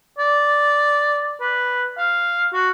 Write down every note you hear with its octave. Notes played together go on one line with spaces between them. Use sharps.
D5
B4
F5
F#4